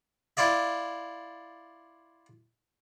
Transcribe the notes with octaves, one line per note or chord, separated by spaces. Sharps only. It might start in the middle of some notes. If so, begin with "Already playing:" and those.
E4 F4 D5 E5